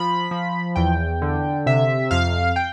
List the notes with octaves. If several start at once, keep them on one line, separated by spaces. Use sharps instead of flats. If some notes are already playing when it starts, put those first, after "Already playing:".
Already playing: F3 B5
F3
E2 G5
D3
C3 E5
F2 F5
G5